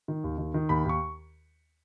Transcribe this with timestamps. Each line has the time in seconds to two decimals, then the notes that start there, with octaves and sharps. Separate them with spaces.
0.08 D#3
0.24 D#2
0.38 D#3
0.54 D#3
0.69 D#2 B5
0.85 D#2 C#6